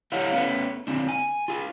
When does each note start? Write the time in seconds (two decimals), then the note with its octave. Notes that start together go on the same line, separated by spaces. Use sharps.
0.12 A3 E4 G4 C#5 F5 F#5
0.33 A3 B3 C#4
0.87 D3 C4 D4
1.09 G#5
1.48 F4 G#4